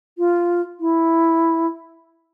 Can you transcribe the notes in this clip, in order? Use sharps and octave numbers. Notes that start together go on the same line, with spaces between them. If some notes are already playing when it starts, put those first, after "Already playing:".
F4
E4